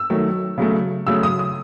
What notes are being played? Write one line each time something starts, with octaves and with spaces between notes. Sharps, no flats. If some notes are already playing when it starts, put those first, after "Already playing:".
Already playing: E6
D#3 F#3 A3
C#3 F#3 A3
C#3 F#3 A3 E6
D#6
D#6